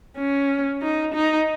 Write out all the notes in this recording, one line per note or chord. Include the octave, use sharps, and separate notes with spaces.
C#4
D#4
D#4